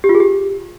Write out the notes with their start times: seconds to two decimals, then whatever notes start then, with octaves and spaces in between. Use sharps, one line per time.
0.04 G4
0.09 F4
0.15 G#4
0.20 G4